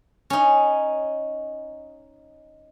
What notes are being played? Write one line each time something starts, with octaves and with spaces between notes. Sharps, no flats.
C#4 D#4